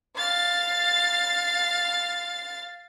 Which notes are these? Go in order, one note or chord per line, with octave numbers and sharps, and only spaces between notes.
F5 A6